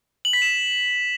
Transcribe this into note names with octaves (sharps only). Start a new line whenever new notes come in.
F#7
B6
E7